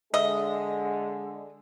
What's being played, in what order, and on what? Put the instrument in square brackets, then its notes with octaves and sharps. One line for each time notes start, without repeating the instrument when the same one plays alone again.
[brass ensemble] D3 G#3 [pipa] D#5 [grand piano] E5